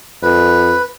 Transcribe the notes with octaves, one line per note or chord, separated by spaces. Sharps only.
F2 B4